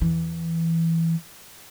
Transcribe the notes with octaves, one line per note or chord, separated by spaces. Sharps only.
E2 E3